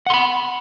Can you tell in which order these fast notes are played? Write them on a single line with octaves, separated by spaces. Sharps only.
F#5 C6 B5